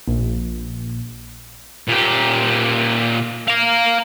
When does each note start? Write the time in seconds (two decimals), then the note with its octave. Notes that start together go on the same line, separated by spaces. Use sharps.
0.08 A#1
1.88 A#2 G4
3.48 F5 A#5